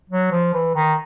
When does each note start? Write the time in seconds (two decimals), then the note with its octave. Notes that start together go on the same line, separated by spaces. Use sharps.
0.09 F#3
0.31 F3
0.53 E3
0.75 D#3